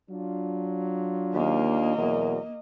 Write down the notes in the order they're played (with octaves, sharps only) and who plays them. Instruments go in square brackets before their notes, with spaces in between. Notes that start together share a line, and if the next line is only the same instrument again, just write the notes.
[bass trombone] F#3 [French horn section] D4 F4
[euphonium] D#2 [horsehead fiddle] A#3 D#5
[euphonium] E2 [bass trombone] B2 [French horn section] F#3 A#4